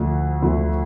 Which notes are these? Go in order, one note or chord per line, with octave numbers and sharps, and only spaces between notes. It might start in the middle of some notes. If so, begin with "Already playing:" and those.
Already playing: D2 D3 F3 A3
D2 D3 F3 A3